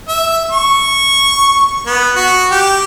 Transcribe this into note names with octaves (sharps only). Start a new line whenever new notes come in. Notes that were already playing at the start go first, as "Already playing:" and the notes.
E5
C#6
B3
F#4
G4